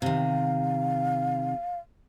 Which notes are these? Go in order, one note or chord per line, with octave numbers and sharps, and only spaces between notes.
C3 D#3 F5